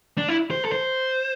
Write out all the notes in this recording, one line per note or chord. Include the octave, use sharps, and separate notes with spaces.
D4
E4
C5
A4
C5